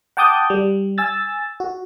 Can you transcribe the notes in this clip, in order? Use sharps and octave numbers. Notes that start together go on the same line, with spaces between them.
F#5 G5 A5 D6 D#6 G6
G3
G#5 E6 A6
F#4